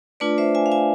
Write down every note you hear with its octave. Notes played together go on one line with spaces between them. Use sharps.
A3 D4 F4 B4 D5
C5 E5
E5 G#5
F5
E5 G#5